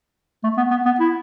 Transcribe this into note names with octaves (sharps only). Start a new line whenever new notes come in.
A3
B3
B3
B3
E4